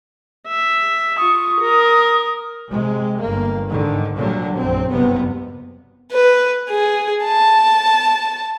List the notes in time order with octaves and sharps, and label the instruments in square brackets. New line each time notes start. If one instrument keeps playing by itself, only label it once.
[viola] E5
[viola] F4 C#6 [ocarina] D#6
[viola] A#4
[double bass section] C3 G#3
G1 A#3
G#2 D3 D#3
A#2 D3 F#3 G3
A#1 F#2 C4
F#1 G2 C3 B3
[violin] B4
G#4
A5